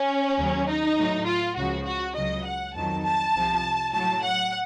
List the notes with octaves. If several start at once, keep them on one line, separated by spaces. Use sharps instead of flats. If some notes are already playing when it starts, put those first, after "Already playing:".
Already playing: C#4
D#2 C#3 F#3
D#4
A2 F#3
F4
C#2 C#3 F3 F#4
F#4
C#2 C#3 F#3 D#5
F#5
F2 D#3 F#3 A5
A5
C2 C3 F3
A2 F#3 A5
F#5